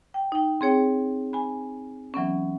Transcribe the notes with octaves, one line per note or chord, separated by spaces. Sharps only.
G5
D#4 G5
C4 G#4 C#5 G5
G#5 B5
E3 F#3 B3 C#4